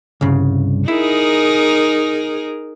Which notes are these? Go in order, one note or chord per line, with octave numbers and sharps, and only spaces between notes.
C2 G2 C#3
D#4 E4 G#4 A#4